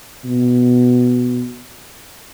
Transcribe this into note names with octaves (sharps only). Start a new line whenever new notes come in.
B2